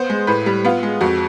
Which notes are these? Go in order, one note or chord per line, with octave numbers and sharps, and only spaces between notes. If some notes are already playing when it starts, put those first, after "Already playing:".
Already playing: B3 C5
G#3
A2 B4
G3
B3 F4
G#3
F2 F#4